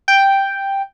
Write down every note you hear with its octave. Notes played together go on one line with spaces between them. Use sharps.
G5